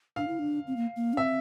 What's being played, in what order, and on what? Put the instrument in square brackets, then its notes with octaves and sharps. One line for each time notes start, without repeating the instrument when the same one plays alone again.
[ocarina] D4 [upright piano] F5
[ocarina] E4
D4
C4
A#3
A#3
D4
[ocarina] C4 [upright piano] E5